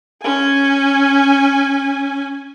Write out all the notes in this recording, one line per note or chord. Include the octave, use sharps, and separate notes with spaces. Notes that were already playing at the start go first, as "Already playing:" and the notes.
C#4 G#5